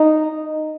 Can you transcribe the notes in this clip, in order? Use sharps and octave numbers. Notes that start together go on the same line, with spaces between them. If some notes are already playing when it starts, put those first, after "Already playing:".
Already playing: D#4